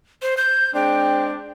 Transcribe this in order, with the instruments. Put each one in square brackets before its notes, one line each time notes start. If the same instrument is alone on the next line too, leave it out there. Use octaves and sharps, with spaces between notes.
[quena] C5
G6
[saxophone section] G#3 C4 D4 [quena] G5